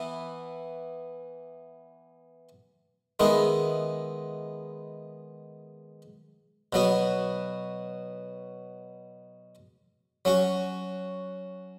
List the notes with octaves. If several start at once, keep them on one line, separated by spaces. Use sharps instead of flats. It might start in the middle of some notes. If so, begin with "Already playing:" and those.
Already playing: E3 B3 E4
D#3 G#3 B3 E4
B2 F#3 B3 F#4
F#3 C#4 F#4